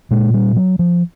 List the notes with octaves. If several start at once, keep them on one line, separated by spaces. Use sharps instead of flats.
A#2 G#3
G3
F#3
F3